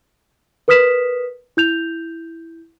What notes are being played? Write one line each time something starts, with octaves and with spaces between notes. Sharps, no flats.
A#4 B4 D#6 F6 B6 E7
E4 G6 F7